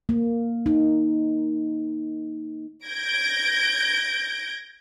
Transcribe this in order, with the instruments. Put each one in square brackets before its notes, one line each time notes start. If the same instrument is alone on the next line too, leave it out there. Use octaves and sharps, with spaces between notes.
[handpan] A#3
D#4
[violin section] G6 G#6 A#6 D7